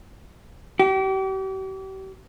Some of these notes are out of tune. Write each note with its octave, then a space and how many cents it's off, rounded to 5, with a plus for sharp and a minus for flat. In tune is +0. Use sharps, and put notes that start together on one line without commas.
G4 -40